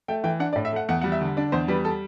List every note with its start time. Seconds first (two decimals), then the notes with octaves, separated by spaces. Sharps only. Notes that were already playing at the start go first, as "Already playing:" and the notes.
0.08 A3 G5
0.24 E3 G5
0.40 D4 F#5
0.53 D5
0.56 A2
0.65 E5
0.73 A3 F#5
0.89 E2 F#5
1.01 G3 F#5
1.12 E5
1.21 D3
1.37 D4 D5
1.52 E2 C5
1.68 G3 B4
1.85 A4